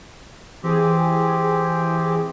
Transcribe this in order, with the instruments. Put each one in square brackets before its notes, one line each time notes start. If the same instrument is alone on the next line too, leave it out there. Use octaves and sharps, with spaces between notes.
[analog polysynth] E3 G#4 [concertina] C4 G4